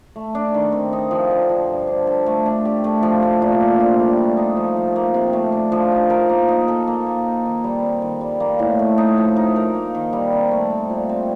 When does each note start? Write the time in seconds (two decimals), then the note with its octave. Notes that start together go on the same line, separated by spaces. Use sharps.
0.16 A3
0.35 D4
0.54 D#3
0.72 C4
0.93 D#4
1.11 F3
1.31 D3
1.49 F3
1.69 G2
1.87 D4
2.07 A4
2.26 A3
2.46 D4
2.65 G4
2.84 A3
3.03 F3
3.23 A3
3.42 A#2
3.61 D4
3.80 F4
4.00 G3
4.18 A3
4.37 D#4
4.56 F3
4.77 F3
4.96 A#3
5.14 C3
5.33 A3
5.52 D4
5.72 F3
5.92 D#4
6.10 A#4
6.29 A#3
6.48 D#4
6.68 A4
6.87 A#3
7.06 A#3
7.25 D#4
7.45 D#3
7.64 G3
7.83 C4
8.02 D#3
8.21 G3
8.40 A#3
8.59 A2
8.79 A3
8.98 D#4
9.18 F3
9.36 D#4
9.56 A#4
9.75 A#3
9.95 D#3
10.13 G3
10.32 C3
10.51 A3
10.70 C4
10.90 A#2
11.09 C4